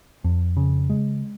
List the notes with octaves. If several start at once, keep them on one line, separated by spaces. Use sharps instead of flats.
F2
C#3
G#3